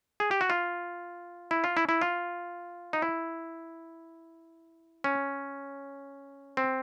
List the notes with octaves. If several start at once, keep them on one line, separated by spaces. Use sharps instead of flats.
G#4
G4
F#4
F4
E4
F4
E4
E4
F4
D#4
E4
C#4
C4